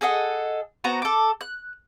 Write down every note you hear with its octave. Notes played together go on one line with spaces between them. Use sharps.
G#4 A4 D#5 F#5
B3 F#4 C5 A#5
A4 D6
F#6